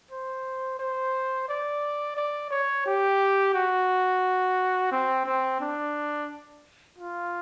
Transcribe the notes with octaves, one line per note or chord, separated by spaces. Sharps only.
C5
C5
D5
D5
C#5
G4
F#4
C4
C4
D4
F4